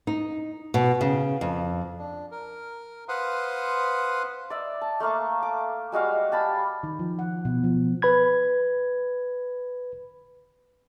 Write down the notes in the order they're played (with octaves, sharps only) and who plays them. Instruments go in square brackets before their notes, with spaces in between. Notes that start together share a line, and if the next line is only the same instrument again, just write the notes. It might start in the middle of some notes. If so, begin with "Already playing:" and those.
[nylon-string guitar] D#4
B2
C#3
F2
[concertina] D4
A#4
B4 C5 F5 F#5 C6 D#6
[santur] D5 E5
A5
A3 A#3 F5 C#6
D6
G3 G#3 F#4 F5
G4 A5 B5
[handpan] D#3
F3
F#5
B2
F3
[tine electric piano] B4 B5 G#6